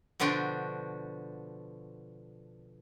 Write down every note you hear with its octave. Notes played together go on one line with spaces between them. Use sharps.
B2 D3 F3 D4 F#4 G5